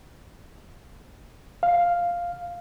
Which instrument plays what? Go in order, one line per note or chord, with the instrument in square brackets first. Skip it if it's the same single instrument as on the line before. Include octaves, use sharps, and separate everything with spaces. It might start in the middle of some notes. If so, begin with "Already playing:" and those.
[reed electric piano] F5